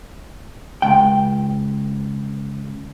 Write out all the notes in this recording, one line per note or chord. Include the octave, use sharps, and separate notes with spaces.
C#2 G5